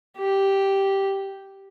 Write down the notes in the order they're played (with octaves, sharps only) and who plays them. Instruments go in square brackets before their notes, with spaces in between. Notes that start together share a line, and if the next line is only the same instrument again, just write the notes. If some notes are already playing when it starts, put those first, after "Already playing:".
[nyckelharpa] G4